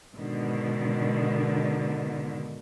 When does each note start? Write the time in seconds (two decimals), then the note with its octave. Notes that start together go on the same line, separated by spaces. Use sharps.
0.14 G#2 B2 D3 D#3